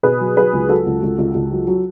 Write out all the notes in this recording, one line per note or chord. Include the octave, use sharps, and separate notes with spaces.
B2 G#4 B4
F#3
F#3 G#4 B4
C#2
F#3 F#4 A4
C#2
C#2
C#2
C#2
F#3
F#3